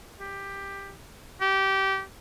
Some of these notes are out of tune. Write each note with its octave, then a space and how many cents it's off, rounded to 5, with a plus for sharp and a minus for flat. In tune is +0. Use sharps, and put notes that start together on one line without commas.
G4 +10
G4 -20